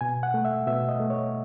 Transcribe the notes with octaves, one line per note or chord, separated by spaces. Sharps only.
B2 G#5
F#5
A3
E5
B2 E5
D#5
A3
C#5